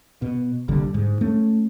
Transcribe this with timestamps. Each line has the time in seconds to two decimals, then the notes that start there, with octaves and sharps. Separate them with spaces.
0.22 B2
0.68 F#1 C2 D3 G3
0.94 G#2
1.21 A3 C#4